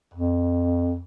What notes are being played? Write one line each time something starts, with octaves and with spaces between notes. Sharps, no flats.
F2